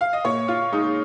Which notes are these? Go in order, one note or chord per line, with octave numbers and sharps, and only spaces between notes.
F5
D#5
A#2 C#5
F4
G#3 D#4